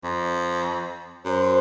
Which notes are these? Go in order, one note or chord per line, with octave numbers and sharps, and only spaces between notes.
F2
F#2 C5